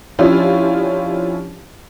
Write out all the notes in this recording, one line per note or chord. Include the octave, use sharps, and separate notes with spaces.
F3 C#4 D4 E4 F4 G4